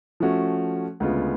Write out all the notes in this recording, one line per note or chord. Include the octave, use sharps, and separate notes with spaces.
F3 A3 C#4 F#4
D2 C#3 G#3 B3 F4